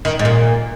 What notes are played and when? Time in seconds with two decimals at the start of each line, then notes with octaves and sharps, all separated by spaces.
0.05 D#3
0.19 G#2
0.25 A#2